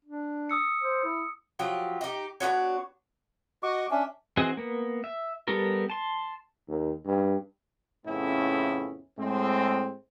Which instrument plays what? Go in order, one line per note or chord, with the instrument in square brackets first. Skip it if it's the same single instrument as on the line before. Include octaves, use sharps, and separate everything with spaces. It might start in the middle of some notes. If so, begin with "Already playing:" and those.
[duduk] D4
[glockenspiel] D#6 E6 C#7
[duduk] C5
E4
[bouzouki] F3 F#3 G4
D#4 G4
B3 D4 F#4 C#5
[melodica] F#4 C#6 D6 [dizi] D#5
[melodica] C#4 D4 [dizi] E5
[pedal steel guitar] E3 C4 F#4 G#4 D#5
A#3 B3
E5
G3 B3 G4 A4 A#4
A5 C6
[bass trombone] D#2
G2
[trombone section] F2 A2 C#3 B3 C#4 E4
A2 G#3 C4